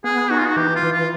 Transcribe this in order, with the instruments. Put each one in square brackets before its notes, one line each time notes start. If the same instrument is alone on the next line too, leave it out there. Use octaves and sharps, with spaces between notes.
[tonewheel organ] B3 [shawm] G#4
[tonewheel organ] D#4 [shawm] F#4
[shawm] F4
F#4
[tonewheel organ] E3 [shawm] G4
[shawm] F4
[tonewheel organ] E3
[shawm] F4